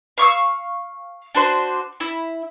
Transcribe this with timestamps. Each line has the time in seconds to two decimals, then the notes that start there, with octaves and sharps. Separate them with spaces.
0.18 F5 C#6 D6 E6
1.35 D4 F#4 C5 C6
2.00 E4